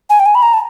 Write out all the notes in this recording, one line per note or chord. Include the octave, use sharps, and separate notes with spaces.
G#5
G5
G#5
B5
A#5
A5